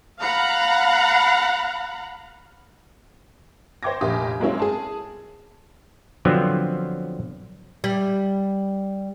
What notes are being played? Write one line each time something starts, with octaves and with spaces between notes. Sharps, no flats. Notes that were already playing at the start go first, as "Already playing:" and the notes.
F5 F#5 A#5 B5
C5 C#5 G5 D6 G#6 A#6
F1 A#1 A#3 G4 D#6
F#3 G#3 A#3 C4 C#4 E4
G#4 A5
D3 F3 F#3 B3 C4
G3